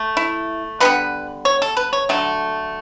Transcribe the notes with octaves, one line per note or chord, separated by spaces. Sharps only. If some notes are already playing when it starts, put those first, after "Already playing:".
Already playing: A3
E4
D3 G3 B3 B4
C#5
A4
B4
C#5
D3 F#3 A3 A4